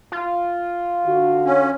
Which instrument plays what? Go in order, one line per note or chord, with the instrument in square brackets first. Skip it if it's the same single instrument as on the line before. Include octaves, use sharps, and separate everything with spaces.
[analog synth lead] F4
[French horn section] D3 F#4
[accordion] C#4